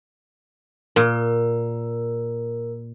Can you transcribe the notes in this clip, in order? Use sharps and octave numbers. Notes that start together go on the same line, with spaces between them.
A#2 A#4